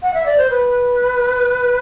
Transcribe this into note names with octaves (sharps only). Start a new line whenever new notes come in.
F#5
E5
D5
C5
B4